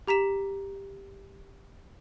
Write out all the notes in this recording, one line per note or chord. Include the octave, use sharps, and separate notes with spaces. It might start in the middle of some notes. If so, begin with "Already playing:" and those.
G4 A#5 B6 E7